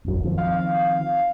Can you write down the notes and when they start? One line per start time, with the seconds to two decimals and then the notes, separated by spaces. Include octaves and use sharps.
0.04 E1 A#1 F#2
0.24 D#3 F3 C4
0.38 F5